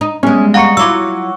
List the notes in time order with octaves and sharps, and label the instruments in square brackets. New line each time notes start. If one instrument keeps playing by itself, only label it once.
[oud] D#4
[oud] G3 G#3 [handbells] B3 [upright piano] C#4
[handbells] F5 A#5 C#7 [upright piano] F#5 C#6
[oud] F#3 E4 F4 [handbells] D6 E6